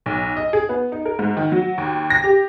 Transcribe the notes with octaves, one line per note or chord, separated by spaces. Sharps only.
B1
D#5
G#4
B3
D#4
A#4
G#2
D#3
F#3
D#2
A#6
G4